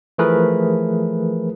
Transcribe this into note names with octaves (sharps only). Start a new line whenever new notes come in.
E3 F3 A3 G#4 A#4 B4